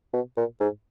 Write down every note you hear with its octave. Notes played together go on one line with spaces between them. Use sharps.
B2
A#2
G#2